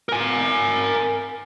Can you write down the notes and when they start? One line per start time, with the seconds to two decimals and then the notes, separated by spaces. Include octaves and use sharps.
0.09 A#4 G#5